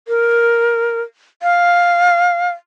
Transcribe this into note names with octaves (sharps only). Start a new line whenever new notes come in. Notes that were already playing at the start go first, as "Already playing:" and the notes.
A#4
F5